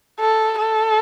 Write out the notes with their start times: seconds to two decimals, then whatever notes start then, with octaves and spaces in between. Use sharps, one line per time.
0.20 A4
0.58 A4